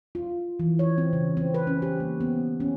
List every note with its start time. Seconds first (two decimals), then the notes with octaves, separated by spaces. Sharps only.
0.15 F4
0.59 E3
0.79 C#5
0.98 C4
1.13 C#3
1.37 C4
1.54 B4
1.67 C#4
1.82 G4
2.00 A#3
2.21 B3
2.60 C#4